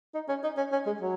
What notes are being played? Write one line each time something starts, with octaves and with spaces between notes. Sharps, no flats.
D#4
C#4
D#4
C#4
C#4
G#3
F#3